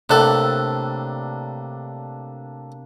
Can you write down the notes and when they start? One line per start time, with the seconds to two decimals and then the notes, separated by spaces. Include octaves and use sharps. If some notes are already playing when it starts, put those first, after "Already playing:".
0.10 A2 C3 A#3 D4 A4 E6 F#6